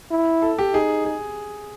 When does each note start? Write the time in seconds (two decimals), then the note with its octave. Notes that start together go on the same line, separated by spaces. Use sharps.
0.11 E4
0.42 A4
0.59 G4
0.73 D#4 G#4
1.05 G#4